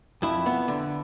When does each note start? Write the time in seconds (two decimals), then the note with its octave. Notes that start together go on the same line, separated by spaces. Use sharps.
0.22 F2 E4
0.46 B3
0.68 D3